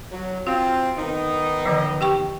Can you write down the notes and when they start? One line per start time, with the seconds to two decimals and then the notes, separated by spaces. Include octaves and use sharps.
0.12 F#3
0.47 C4 F4 F#4
0.98 D#3 B3 D#4
1.66 D3 E3 F3
2.01 G4 G5 C#6